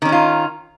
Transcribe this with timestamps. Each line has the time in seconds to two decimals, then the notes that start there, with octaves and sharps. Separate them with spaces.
0.02 D#3
0.05 C#4
0.09 D#4
0.12 F4